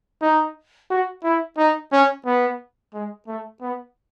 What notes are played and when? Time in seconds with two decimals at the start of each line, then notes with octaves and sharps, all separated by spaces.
0.22 D#4
0.90 F#4
1.23 E4
1.57 D#4
1.92 C#4
2.26 B3
2.93 G#3
3.27 A3
3.61 B3